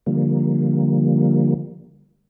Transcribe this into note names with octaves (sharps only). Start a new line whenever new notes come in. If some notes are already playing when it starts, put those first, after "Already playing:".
D3 F3 G3 A#3